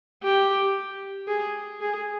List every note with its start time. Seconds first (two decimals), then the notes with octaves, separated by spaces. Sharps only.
0.24 G4
1.28 G#4
1.81 G#4